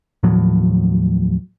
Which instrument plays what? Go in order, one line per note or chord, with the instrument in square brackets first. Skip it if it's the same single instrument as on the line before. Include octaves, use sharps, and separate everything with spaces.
[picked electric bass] D#2 A2 F3 F#3